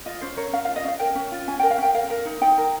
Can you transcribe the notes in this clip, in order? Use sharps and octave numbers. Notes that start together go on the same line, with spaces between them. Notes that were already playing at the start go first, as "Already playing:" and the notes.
F4 D#5
C#4 C5
A#4 C#5
C#4 F5
F5
F4
D#5
C#4 F5
A#4 G5
C#4
F4
C#4 G#5
A#4 G5
F5
C#4 G5
A#4 F5
A#4
D#4
D#4 G5
A#4